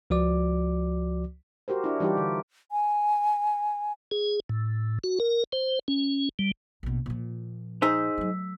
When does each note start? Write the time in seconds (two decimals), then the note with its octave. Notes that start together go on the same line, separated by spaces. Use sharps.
0.10 C#2 F3 F#4 D5 D6
1.68 F#4 G4 A#4 C5
1.84 D4 E4
2.00 E3 G3 D#4 F4 G4
2.17 D3
2.72 G#5
4.11 G#4
4.49 A2
5.04 F#4
5.20 A#4
5.53 C5
5.88 C#4
6.39 G3
6.83 A#1 B2
7.06 A#2 F3
7.82 D#4 G#4 C5 E6 B6
8.18 F#3 A3